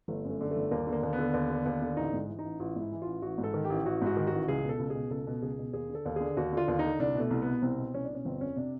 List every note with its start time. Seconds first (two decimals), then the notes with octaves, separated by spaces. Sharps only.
0.08 G1 A3
0.25 F#2
0.30 A3
0.41 D3
0.51 G1 A3
0.71 D#2 A#3
0.87 D3
0.92 A#3
1.03 D#2
1.13 B3
1.19 D3
1.34 D#2
1.50 D3
1.66 D#2
1.82 D3
1.97 A1 D#4
2.13 G#2
2.29 E3
2.39 D#4
2.44 A1
2.59 A1 F4
2.76 G#2 E4
2.92 E3
3.02 A1 F4
3.22 A1 F#4
3.38 G#2
3.44 A4
3.54 D#3
3.65 G4
3.70 A1
3.85 A1 F#4
4.01 G#2 F#4
4.17 D#3
4.27 F#4
4.32 A1
4.48 C#2 G#4
4.64 B2
4.69 A4
4.79 C#2
4.90 G#4
4.95 B2
5.11 C#2 A4
5.27 B2
5.42 C#2 G#4
5.59 B2
5.73 D#2 G#4
5.89 D3
5.95 A4
6.06 D#2
6.16 D3 G#4
6.37 D#2 F#4
6.53 D3 F4
6.68 D#2
6.79 D3 D#4
6.99 C2 D4
7.15 B2
7.20 A3
7.31 C2
7.42 B2 B3
7.62 C2 C4
7.78 B2
7.94 C2 C#4
8.04 D4
8.10 B2 C#4
8.25 G1 C4
8.41 F2 C#4
8.56 C3 D4